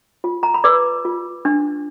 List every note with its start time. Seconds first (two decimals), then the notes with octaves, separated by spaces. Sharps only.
0.24 F4
0.43 A#5
0.54 B5
0.64 B4 D5 D6
1.05 F4
1.45 D4